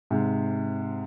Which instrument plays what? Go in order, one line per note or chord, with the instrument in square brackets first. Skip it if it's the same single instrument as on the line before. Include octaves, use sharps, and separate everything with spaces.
[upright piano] G#2 C3